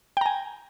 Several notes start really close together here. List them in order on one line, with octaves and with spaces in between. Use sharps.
G5 A#5 G#5